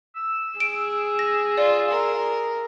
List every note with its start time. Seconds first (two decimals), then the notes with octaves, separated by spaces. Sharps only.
0.16 E6
0.60 G#4 D7
1.19 A#6
1.58 F4 D5
1.90 A#4